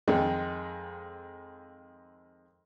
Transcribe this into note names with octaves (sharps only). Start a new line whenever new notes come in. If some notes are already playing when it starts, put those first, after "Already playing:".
F2 D#3 G#3